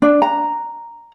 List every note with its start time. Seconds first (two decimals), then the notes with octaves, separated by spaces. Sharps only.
0.02 D4
0.22 A#5